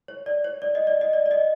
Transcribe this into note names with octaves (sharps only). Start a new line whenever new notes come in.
C#5
D5
C#5
D5
D#5
D5
D#5
D5
D5
D#5